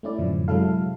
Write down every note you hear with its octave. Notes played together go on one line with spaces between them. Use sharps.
A3 C#4 E4 D5
F#2 A2 D3 E3 F3
C3 F#3 G#3 E4 A4 F5